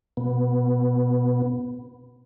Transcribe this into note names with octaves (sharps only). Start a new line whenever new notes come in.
B2 B3